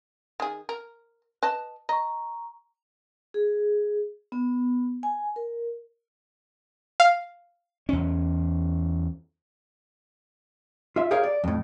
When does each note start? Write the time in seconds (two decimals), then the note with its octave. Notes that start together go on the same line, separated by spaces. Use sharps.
0.40 D#3 G#4
0.69 A#4
1.43 B4 D#5 A5
1.89 D#5 A#5 C#6
3.34 G#4
4.32 B3
5.03 G#5
5.36 A#4
7.00 F5
7.89 E2 C#4
10.96 F4 E5
11.11 G4 G#4 A#4 C#5 F5
11.24 D5
11.44 F2 A2